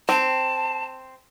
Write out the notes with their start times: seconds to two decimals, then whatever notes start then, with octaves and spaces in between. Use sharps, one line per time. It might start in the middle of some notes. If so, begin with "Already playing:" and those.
0.09 C4 A5